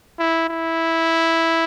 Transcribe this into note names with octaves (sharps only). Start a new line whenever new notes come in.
E4
E4